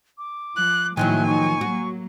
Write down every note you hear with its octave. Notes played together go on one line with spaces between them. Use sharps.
D6
F3 F#6
A2 D#3 F3 F#3 A#3 E4 G#5 F#6
D#4 C#6
F#3 A#3 F#4